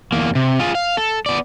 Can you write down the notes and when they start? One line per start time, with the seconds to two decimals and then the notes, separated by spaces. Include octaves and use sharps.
0.12 E2 A#3
0.35 C3
0.60 F4 G#4
0.75 F5
0.97 A4
1.26 B3 D5